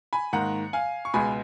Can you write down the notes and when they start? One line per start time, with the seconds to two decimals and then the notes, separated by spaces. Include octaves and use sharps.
0.13 G#5 B5
0.33 G#2 D#3 A#3 F#5 A#5
0.73 F5 G#5
1.05 C#6
1.14 C#2 B2 G#3 G#5 B5